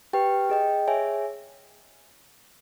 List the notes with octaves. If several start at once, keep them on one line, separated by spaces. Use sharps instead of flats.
G4 B4 G5
G#4 D#5 G5
G#4 C#5 E5 G#5